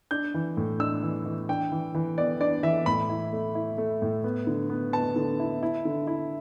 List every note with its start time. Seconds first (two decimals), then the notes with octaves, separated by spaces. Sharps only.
0.11 D4 G6
0.34 E3
0.57 A2
0.80 D4 E6
1.03 E3
1.26 E3
1.49 D4 G5
1.72 E3
1.95 E3
2.18 B3 D5
2.41 D4 D5
2.63 E3 E5
2.86 A2 B5
3.09 E4
3.33 A3
3.55 E4
3.78 A3
4.02 A2
4.24 B3
4.47 D3
4.70 B3
4.93 B3 A5
5.16 D3
5.39 E4
5.63 E4
5.85 D3
6.07 E4